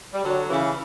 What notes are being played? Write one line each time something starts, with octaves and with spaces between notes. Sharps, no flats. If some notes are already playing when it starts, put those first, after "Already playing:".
G3
D3 F#3
C#3 E3